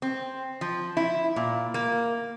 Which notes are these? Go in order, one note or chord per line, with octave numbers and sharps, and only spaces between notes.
C4
F3
E4
A#2
A#3